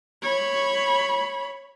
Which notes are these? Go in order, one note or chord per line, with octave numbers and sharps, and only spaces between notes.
C#5 B5